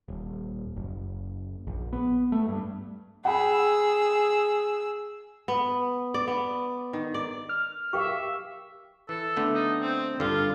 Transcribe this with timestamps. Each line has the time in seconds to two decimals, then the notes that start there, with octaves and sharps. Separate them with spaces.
0.08 D#1
0.76 F#1
1.67 A#1
1.93 B3
2.32 A3
2.48 G2
3.25 G#4 F#5 G5 B5 E6
5.48 B3
6.14 D5
6.27 B3
6.93 D#3
7.14 D5
7.49 F6
7.93 G4 A#4 E5 F5 G5 C#6
9.09 E3 A4
9.37 D3 A3 B3
9.54 D#4
9.82 C4
10.20 G2 D3 F4